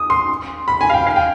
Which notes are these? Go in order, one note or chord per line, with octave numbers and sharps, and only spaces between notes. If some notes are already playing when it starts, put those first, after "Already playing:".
Already playing: D#6
C6
B5
G#5
F5
G5
F5
G5